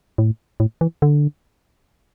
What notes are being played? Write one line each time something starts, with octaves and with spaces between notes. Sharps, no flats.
A2
A2
E3
D3